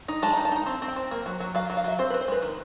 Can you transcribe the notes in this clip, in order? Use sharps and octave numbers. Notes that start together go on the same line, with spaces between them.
D#4
G#3 A5
D#4 A#5
A5
D#4 A#5
C4
C4
G5
C4
A#3
F#3
F#3
F#3 F5
F#3
F5
F#3 E5
C4 C5
C4 B4
C5
G#3 B4
D#3